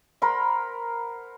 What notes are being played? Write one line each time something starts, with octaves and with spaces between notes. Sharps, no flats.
A#4 C5 F#5 B5